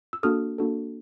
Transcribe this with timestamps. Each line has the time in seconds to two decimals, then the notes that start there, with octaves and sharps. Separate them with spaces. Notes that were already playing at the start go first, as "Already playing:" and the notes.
0.13 E6
0.23 A#3 D4 F#4 A4 D#6 F6
0.58 A#3 D4 F#4 A4